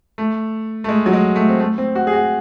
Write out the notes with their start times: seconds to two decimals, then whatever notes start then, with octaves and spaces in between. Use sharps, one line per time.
0.18 A3
0.84 A3
0.89 G#3
1.06 F#3
1.13 G#3
1.36 A3
1.49 C4
1.60 A3
1.78 C4
1.95 F#4
2.07 G#4
2.13 F#4